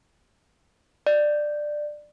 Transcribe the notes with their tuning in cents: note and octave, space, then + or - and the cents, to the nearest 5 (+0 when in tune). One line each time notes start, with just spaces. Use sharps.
D5 +15